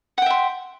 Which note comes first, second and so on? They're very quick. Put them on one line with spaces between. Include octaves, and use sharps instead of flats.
F#5 G5 E5 C6